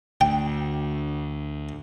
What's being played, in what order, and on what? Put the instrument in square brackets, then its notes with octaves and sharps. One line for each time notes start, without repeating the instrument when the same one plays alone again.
[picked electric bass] D2 [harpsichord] G5